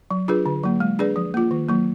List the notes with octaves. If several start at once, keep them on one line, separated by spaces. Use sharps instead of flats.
F#3
D4 F4 G#4 B4
D3
F#3 A#3
G#3
D4 G#4 B4 D5
F3
A#3 F4
D#3
F#3 A#3